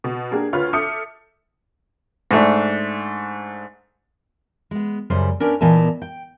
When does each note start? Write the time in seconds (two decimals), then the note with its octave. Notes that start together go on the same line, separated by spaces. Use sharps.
0.04 B2
0.31 A#3 D4 G4 G#4 A#4
0.53 D2 F4 B4 C#5 F6
0.73 A4 E5 D6 D#6 G6 C#7
2.31 G#2 A3 D4
4.71 G#3 B3
5.10 F#2 C#3 G3 C5
5.40 B3 C#4 D4 A#4
5.61 A#2 E3 B3 A#4 D#5 A5
6.02 G5